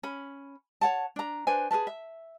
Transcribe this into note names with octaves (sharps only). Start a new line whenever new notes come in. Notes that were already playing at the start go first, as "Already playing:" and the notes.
C#4 B5
C#5 F#5 A5
D4 A#5
D4 B4 C5 G#5
G#4 A#4 B4 A5
E5